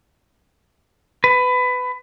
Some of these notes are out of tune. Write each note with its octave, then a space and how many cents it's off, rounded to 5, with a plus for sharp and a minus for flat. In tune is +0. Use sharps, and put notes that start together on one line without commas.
B4 +20